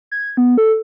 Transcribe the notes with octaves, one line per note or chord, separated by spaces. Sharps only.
G#6
B3
A4